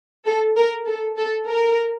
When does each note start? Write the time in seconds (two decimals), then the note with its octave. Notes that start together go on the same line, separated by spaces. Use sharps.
0.26 A4
0.57 A#4
0.87 A4
1.18 A4
1.48 A#4